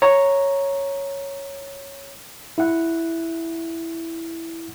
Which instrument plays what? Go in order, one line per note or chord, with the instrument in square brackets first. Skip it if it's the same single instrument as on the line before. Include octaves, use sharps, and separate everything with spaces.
[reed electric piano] C#5 A#5
[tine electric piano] E4 F#5